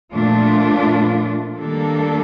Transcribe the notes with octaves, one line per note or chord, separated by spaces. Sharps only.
A#2 F3 A3 D4 F4
D#3 G3 A#3 D4 A4